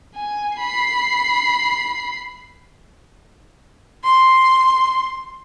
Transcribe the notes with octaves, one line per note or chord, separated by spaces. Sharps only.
G#5
B5 C7
C6